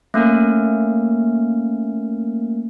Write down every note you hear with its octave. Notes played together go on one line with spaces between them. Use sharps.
A3 A#3 C#4 A#4